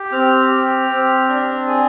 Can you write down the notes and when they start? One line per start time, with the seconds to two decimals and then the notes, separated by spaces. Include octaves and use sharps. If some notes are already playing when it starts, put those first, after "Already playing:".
Already playing: G4
0.12 C4 F6
0.51 G4
0.90 C4
1.29 D4
1.67 G#4